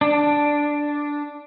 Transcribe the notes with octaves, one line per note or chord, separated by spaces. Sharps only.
D4